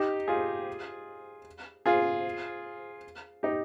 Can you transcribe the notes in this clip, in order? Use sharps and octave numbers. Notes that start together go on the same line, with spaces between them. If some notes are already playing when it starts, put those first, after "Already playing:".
Already playing: D#4 G4
F4 G#4
F4 G#4
D#4 G4